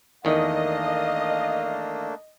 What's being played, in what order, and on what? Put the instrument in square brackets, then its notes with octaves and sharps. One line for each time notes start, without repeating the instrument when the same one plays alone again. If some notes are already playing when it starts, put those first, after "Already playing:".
[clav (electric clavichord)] E2 D#3 [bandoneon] A3 A#3 D4 [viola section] D#5 [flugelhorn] F5